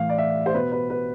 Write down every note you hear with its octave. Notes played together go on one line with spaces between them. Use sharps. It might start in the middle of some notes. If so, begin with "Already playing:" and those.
Already playing: A2 E3 F5
D5
E5
C5
B2 B4
B4
B4